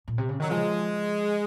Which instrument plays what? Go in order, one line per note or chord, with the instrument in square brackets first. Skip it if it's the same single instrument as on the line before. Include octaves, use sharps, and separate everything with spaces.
[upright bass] A#2
C3
C#3
[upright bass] D#3 [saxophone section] F#3
[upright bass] F3 [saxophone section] G#3